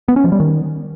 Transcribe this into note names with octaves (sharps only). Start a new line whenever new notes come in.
B3
C#4
F3
G3
D#3